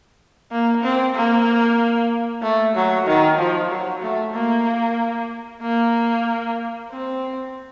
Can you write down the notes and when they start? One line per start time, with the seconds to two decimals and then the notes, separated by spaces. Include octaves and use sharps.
0.52 A#3
0.83 C4
1.16 A#3
2.43 A3
2.75 F#3
3.06 D#3
3.38 F3
3.71 F#3
4.03 A3
4.34 A#3
5.62 A#3
6.91 C4